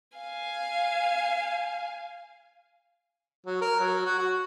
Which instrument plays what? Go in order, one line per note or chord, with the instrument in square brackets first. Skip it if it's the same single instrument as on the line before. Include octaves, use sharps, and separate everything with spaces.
[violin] F5 G#5
[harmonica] F#3
A#4
F#3
F#4
F#4